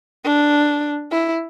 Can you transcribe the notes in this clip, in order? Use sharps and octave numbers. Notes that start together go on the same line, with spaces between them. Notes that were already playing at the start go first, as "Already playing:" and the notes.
D4
E4